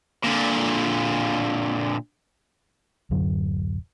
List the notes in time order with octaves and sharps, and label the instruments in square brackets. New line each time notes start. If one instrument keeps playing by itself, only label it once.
[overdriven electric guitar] A#2 D3
[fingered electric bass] D1 F#2 D3 F#3